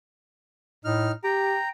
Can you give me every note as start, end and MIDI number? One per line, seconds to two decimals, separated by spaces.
0.85 1.12 45
0.85 1.12 63
0.85 1.12 89
1.24 1.57 67
1.24 1.68 79
1.24 1.68 82